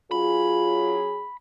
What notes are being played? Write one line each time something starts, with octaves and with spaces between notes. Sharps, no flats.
F#3 C#4 F4 G#4 B5